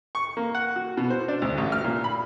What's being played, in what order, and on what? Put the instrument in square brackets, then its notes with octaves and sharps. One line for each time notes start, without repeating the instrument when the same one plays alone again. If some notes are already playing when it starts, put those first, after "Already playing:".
[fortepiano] C#6
A#3
F#5
F#4
B2
C5
D4
D2
A1
F6
A#2
B5